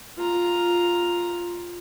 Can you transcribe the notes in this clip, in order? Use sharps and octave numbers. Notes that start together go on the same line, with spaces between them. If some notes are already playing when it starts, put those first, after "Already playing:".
F4 A#5